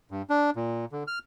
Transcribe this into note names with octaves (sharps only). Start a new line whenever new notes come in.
G2
D4
A#2
D3
F6